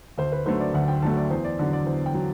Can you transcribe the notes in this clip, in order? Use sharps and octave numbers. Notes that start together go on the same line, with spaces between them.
D2 C5
B4
D3 F#3 A3 C5
D5
D2 F#5
G5
D3 F#3 A3 A5
D5
E2 C5
D5
D3 F#3 D5
D5
E2 C5
G5
F#3